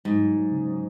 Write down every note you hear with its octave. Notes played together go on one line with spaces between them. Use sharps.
G#2 F#3
F#3
F#3
C#3
F#3